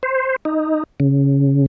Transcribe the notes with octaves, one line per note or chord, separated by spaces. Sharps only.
C5
D#4
C#3